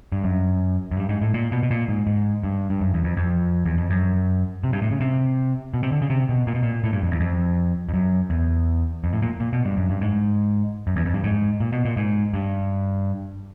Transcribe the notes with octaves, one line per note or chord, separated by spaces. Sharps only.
G2
F#2
F#2
G2
G#2
A2
A#2
B2
B2
A#2
G#2
G#2
G2
G2
F#2
E2
F2
F2
E2
F2
F#2
C3
G2
A2
C#3
C3
B2
C3
D3
C#3
C3
B2
A#2
B2
A#2
A2
G2
F2
E2
F2
F2
F#2
E2
F2
A2
A#2
A#2
B2
G2
F#2
G2
G#2
F#2
E2
F2
G2
G#2
A#2
B2
A#2
G#2
G2